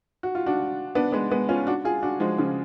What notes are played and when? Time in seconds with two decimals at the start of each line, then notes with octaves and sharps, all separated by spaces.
0.23 F#4
0.35 F4
0.47 D4 F#4
0.95 B3 D4
1.12 G#3 B3
1.31 G#3 B3
1.49 C#4 F4
1.67 D4 F#4
1.85 F4 G#4
2.03 D4 F#4
2.20 F3 G#3
2.38 C#3 F3